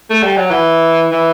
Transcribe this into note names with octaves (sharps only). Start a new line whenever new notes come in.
A3
G3
F#3
E3
E3